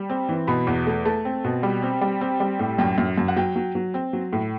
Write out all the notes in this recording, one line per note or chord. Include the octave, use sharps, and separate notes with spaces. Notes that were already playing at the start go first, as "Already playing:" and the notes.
Already playing: G3
C4
E3
B2 B5
E2
A3
A3 A5
C4
B2
G3
C4
G3
C4
G3
A2
F#2 G5
F#2
F#2
F#5
F#3 G5
F#3
F#3
C4
F#3
A2